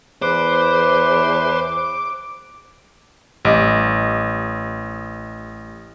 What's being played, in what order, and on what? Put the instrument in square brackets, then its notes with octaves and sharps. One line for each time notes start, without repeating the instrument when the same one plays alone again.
[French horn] E2 [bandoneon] B4 [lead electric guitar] C5 [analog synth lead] D6
[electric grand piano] A1 [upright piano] G3 D#5 D6